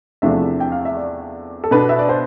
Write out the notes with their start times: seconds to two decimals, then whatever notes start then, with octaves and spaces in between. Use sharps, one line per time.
0.22 E2 C3 F3 A3 D4 E5
0.60 G5
0.72 F5
0.85 E5
0.97 D5
1.64 A4
1.71 B2 B3 D4 B4
1.89 E5
1.99 D5
2.09 C5